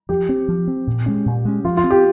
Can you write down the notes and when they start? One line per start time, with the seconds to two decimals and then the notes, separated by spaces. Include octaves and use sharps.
0.09 F3 G4
0.29 C4
0.48 F3
0.68 C4
0.87 A#2
1.06 G#3 C#4
1.26 A#2
1.45 G#3 C#4
1.65 F3 F4
1.77 F4
1.84 C4
1.90 G4